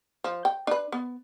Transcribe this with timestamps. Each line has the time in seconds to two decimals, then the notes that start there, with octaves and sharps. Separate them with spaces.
0.24 F3
0.45 G5
0.67 D4 B4
0.92 B3